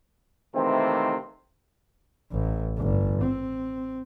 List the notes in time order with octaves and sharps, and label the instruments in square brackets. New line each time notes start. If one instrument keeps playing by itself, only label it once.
[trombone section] C3 D#3 E3 A3 A#3 C4
[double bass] A1
G1
C4